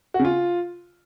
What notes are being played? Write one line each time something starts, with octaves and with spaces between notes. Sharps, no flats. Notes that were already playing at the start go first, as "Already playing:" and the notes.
F#4
C#3
F4